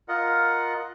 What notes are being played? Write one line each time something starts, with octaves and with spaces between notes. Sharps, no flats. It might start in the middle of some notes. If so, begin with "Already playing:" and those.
F4 A#4 D#5 F#5